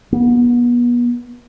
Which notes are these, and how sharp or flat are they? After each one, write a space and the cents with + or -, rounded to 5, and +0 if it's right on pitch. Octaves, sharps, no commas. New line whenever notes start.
B3 -35